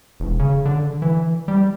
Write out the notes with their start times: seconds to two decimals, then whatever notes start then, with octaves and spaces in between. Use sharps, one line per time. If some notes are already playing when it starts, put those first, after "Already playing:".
0.20 E1
0.39 C#3
0.65 D3
1.02 E3
1.48 G3